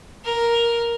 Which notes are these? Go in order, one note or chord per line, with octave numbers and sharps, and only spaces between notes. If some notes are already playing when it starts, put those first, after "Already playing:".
A#4